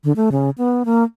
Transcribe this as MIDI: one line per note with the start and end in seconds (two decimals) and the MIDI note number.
0.04 0.12 50
0.16 0.29 57
0.32 0.50 49
0.58 0.83 59
0.85 1.04 58